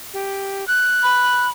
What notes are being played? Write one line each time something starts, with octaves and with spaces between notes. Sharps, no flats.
G4
F#6
B5